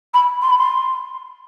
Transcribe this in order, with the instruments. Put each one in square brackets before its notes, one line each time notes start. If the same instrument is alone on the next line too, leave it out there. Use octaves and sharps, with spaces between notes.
[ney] B5
C6
B5
C6